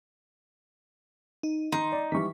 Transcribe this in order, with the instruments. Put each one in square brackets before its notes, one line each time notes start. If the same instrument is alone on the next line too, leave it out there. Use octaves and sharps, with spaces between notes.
[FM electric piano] D#4
[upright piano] D#3 [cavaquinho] D#4 [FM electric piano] C6
[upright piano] D5
[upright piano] D#3 E3 G3 [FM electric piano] C#6 B6